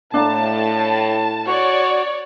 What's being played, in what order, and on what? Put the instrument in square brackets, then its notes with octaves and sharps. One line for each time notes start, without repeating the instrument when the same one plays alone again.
[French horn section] A2 [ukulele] D4 F5 A#5 [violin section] A5
[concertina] F#4 [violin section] C#5 D5